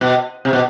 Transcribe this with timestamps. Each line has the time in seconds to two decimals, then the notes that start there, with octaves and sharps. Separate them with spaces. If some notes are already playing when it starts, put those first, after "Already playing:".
0.01 B2
0.45 C3
0.53 B2